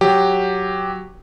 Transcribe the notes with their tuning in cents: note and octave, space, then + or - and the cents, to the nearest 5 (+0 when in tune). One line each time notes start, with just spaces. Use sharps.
F#3 +0 G4 +0